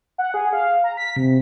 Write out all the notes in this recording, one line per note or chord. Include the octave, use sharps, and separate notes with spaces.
F#5
G#4
F5
A#5
B6
C3